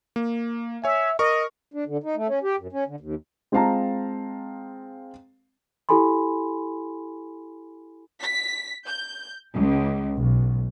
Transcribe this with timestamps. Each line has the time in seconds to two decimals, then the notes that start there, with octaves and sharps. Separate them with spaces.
0.16 A#3
0.84 C#5 E5 G#5
1.19 A#4 D#5 C#6
1.74 D4
1.86 D3
2.03 D#4
2.16 A3
2.28 C#4
2.43 G4
2.59 F#2
2.72 C#4
2.87 D3
3.00 D#2
3.52 G#3 C4 F4 F5 A5 A#5
5.89 E4 G4 A4 G#5 B5 C6
8.22 B6
8.87 G6
9.55 C#2
10.17 B1